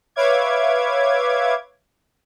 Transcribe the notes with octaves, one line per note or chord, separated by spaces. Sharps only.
B4 C#5 E5 F5 D6 G#6